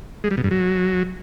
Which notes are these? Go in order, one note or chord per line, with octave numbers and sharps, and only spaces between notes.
G#3
G3
B2
G2
F#3